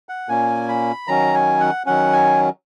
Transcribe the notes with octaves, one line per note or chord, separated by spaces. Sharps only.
F#5
A#2 A#3 C#4 G#5
B5
D#3 F#3 C#4 A#5
G#5
F#5
D#3 F#3 C#4 F#5
G#5